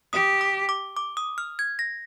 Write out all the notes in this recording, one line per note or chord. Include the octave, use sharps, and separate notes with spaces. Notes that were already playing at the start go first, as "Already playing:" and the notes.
G4 D#6
D6
D6
D6
D#6
F6
G#6
A#6